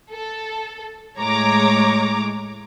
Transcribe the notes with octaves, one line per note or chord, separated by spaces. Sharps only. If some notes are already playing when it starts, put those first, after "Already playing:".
A4
A2 G#3 C#5 A#5 D6